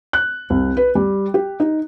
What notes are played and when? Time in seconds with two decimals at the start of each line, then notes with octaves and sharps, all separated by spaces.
0.13 F#6
0.50 C2
0.77 B4
0.95 G3
1.34 G4
1.60 D#4